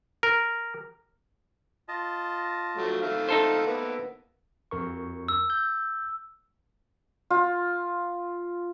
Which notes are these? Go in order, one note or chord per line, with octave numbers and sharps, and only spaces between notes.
A#4
F4 D#5 A5
F3 F#3 A3
D#3 A3 E5 F5
D#4 A4 C5
A#3 B3
F2 A#4 C#6
E6
G6
F4